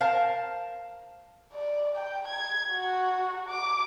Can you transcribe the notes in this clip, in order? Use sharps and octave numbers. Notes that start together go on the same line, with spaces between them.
A#4 C5 F5 A5
D5
G5
G#6
F#4
D6